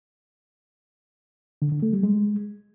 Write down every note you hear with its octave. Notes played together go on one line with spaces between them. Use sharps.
D3
D3
A3
G3
G#3